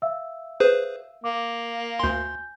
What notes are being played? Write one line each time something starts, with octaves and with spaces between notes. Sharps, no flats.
E5 F5 E6
G#4 B4 C5
A#3 D6
D2 G#5 C6 G6